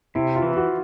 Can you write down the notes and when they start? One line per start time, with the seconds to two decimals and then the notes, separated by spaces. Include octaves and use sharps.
0.15 C3 E4
0.36 F4
0.42 E3
0.56 F#4